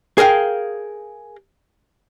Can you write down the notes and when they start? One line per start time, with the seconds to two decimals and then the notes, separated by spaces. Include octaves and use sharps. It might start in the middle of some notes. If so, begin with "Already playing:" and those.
0.18 G#4 A#4 F5 G5